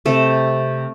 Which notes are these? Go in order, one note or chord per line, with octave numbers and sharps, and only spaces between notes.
C3 A3 A4